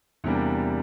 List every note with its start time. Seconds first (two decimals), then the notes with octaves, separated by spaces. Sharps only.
0.24 E2 C3 G3 A#3 D4